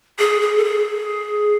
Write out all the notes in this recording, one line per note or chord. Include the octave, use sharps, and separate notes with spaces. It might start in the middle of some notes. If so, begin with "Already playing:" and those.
G#4
G#4
A4
G#4